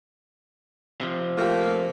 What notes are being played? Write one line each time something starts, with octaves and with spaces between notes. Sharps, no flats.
C3 F3
A3 A#3 F4 G4